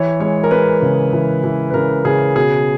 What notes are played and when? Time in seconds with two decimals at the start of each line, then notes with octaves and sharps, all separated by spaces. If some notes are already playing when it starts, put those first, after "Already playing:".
Already playing: E3 C#5
0.20 G#3 C#5
0.44 A#4
0.51 G#3 B4
0.82 C#3
1.13 E3
1.44 E3
1.70 B4
1.74 C#3 A#4
2.05 C#3 G#4
2.36 B2 G#4